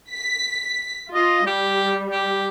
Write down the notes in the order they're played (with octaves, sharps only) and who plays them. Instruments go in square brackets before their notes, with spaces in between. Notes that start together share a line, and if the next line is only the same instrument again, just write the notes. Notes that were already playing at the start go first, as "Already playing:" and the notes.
[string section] B6
[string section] F4 [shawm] D#5
[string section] G3 [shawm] G4
[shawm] G4